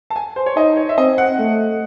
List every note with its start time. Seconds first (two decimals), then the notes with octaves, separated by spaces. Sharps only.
0.10 A5
0.16 G#5
0.36 C5
0.46 C#5
0.56 D#4 D#5
0.77 C#5
0.89 E5
0.98 C4 D#5
1.18 F#5
1.39 A3